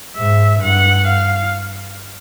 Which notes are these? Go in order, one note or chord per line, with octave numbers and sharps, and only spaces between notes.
G#2 E5
G2 F#5
F5